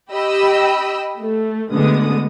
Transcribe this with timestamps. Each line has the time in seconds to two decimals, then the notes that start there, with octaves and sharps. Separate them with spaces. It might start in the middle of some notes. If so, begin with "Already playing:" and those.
0.11 G4 D#5 G5 B5 E6
1.19 A3
1.72 D2 D3 G#3 B3 D#6